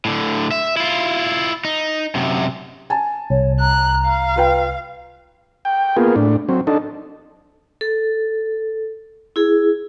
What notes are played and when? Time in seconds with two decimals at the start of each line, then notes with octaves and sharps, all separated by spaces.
0.05 A2 D3
0.51 E5
0.77 E4 F4
1.65 D#4
2.15 F#2 C3
2.90 G#5 A5
3.30 C2 C#5
3.60 A#5 F#6
4.07 F5
4.36 F4 B4 G5
5.65 G5
5.96 A#3 B3 F4 G#4
6.16 A2 D4
6.49 F#3 C4
6.67 D4 D#4 A4
7.81 A4
9.36 E4 G#4